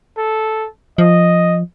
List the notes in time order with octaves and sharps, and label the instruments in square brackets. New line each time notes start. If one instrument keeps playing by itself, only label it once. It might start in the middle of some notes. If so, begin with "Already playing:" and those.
[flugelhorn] A4
[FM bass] F3 [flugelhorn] D#5